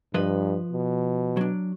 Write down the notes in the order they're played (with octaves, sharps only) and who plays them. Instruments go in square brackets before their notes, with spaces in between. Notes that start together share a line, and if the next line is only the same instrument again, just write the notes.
[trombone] G2 [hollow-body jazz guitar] F3 B4 D#5
[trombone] B2
[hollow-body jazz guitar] F#3 D4